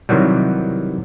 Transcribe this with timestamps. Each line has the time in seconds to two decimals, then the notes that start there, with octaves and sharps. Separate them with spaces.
0.09 C3 D#3 E3 F#3 G3